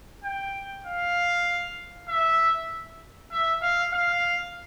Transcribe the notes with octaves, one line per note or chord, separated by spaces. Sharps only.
G5
F5
E5
E5
F5
F5